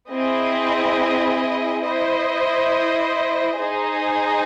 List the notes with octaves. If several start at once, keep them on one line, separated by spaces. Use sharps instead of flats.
C4 E4 G#4 D#5
E4 C5 D#5
D#4 G#4 C5 D#5 G#5